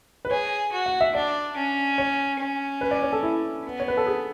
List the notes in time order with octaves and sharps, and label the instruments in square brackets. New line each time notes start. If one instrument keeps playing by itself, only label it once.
[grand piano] B4
[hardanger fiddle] G#4 [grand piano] C#5
[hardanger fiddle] F#4
[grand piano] F#5
E5
[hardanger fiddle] D4 [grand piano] D5
[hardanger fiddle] C#4
[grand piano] C#5
[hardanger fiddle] C#4
[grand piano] B4
D5
C#5
A4
E4
[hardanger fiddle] B3
[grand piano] C#5
B4
A4
G#4